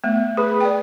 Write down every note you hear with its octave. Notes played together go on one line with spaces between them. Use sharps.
A3 B3
G#4 B4
D5 G5